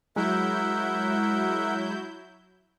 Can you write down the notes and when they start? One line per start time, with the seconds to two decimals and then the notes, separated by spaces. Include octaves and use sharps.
0.16 F#3 G#3 E4 A#4 E5 F#5 G6